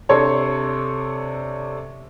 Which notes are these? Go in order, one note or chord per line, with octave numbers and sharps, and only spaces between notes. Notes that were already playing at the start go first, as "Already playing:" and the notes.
C3 D4 A4 C#5 C6